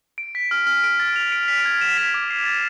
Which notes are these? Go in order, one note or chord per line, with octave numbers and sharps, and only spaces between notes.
D7
B6
F6
F6
D7
A6
F7
D7
B6
G#6
E7
B6
D6
C7
A6